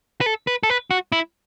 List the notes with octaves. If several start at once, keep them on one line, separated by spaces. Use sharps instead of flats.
B4
A4
B4
A4
B4
F#4
E4